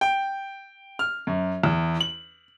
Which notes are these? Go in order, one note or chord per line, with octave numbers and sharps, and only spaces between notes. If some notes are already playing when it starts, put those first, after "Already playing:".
G5
F6
F#2
E2
F#7